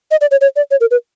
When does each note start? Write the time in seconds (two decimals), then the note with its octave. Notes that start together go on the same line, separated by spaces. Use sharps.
0.11 D#5
0.21 D5
0.31 C#5
0.41 C#5
0.56 D5
0.71 C#5
0.81 A#4
0.91 B4